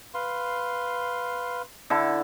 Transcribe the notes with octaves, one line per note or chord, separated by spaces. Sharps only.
B4 F5 C6
D3 E4 A5